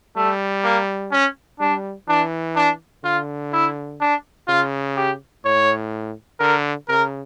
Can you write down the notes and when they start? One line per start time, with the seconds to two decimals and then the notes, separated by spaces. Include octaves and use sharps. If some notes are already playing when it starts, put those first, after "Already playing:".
0.16 G3 A3
0.64 A#3
1.12 C#4
1.60 G3 D4
2.08 E3 D4
2.56 D4
3.04 D3 F4
3.53 E4
4.00 D4
4.48 C#3 F4
4.96 G4
5.45 A2 C#5
6.40 D3 A#4
6.88 C#3 A#4